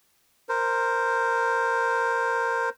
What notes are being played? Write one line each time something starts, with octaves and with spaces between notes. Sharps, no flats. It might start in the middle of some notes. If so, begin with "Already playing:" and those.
A#4 C5